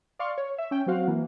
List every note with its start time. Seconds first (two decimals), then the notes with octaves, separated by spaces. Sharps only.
0.19 D5 F5 C6 C#6
0.38 C#5
0.58 E5
0.71 C#4 G5
0.86 F#3 C4 F#4 F5 F#5
1.08 E3 A#3